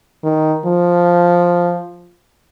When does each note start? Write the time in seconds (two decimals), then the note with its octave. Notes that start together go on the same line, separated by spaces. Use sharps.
0.24 D#3
0.65 F3